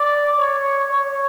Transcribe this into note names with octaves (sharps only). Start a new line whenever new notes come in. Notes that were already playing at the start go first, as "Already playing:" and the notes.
Already playing: D5
C#5
C#5